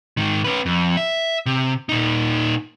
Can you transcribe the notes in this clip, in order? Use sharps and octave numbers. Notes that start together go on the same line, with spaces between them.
G#2 D#3
C#4 B4
F2
E5
C3
A#2 D#4